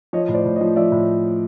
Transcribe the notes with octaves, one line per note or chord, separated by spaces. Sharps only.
F3 C#5 D#5
A2
C5 D5
A2
C#5 D#5
F3
F3 D5 E5
A2